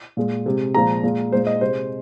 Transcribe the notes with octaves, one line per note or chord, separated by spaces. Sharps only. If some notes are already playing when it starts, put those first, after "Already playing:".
A#2 G#3
C3 G#3
A#2 F3 G#3 A#5
A#2 G#3
A#2 G#3 C5
D#5
C3 G#3 C5